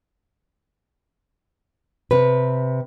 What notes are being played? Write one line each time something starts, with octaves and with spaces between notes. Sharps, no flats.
C3 B4